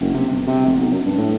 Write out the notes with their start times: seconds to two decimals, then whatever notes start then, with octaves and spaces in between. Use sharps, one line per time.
0.01 F#1
0.14 C3
0.29 G1
0.47 C3
0.66 F1
0.78 B1
0.91 F#2
1.05 G2
1.18 A2